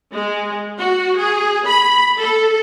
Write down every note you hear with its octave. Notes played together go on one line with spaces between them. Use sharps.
G#3
F#4
G#4
B5
A4